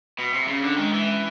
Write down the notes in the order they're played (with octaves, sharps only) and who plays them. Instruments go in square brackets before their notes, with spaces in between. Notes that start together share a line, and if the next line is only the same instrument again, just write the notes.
[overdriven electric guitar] B2
C3
[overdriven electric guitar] C#3 [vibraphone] C#4
[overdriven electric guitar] D3 [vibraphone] D4
[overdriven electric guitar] D#3 [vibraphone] G#3
[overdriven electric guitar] E3